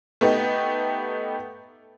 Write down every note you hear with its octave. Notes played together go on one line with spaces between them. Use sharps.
A3 B3 D#4 G4